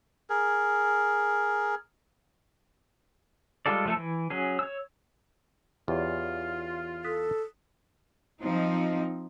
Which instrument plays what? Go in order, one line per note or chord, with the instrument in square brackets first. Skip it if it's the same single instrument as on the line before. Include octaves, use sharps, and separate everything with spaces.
[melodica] G#4 A#4
[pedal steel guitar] G3 G#3 F4 A4 D5
F3 A3 A4
E3
F#3 C#4 G#4
C#5 E6
[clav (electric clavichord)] E2 [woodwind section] F4 [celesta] G4 C#5 D5
[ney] A4 [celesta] D#6 F#6 B6
[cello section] F3 C4 D#4